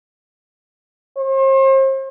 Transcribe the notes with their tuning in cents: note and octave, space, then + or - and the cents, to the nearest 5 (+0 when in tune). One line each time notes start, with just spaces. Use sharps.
C5 +40